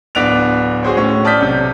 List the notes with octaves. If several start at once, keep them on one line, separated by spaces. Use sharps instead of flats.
D1 B3 D4 F#6 D7 F7
F#4 G#4 C5 C#5
A2 C#4
D5 A5 D#6 F6 G6 B6
B1 C3